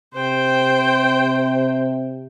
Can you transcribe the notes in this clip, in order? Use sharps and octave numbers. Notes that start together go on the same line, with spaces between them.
C3 C5 G5